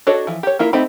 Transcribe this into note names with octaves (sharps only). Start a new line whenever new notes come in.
D4 F#4 A4 C#5 D#5
E3 F3
G4 C#5
A#3 E4 F4 A#4
A3 C4 D#4 G4 B5